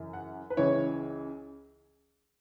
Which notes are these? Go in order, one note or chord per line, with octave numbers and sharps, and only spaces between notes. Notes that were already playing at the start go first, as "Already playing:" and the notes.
Already playing: F#2 C#3 E3
F#5
B4
C#2 C#3 E3 C#5